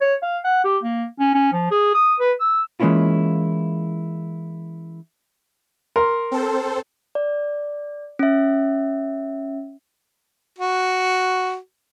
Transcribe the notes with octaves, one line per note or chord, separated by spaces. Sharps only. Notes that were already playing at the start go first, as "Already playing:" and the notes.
C#5
F5
F#5
G4
A#3
C#4
C#4
F3
G#4
D#6
B4
E6
E3 G#3 A#3 C#4 E4 F4
A#4 C6
C4 A4 C5
D5
C#4 E5
F#4